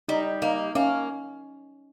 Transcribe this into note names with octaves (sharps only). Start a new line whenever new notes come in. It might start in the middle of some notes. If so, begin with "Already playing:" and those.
G3 D#4
A#3 D#4
A#3 C#4